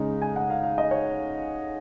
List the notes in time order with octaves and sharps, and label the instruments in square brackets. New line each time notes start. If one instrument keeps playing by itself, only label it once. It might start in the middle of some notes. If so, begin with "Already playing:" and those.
Already playing: [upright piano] C#3 G#3 D#4
G#5
F#5
F5
F5
D#5
C#5